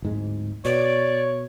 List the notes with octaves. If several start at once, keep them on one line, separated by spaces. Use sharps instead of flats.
D1 G#2 G#3
B2 C#5 D5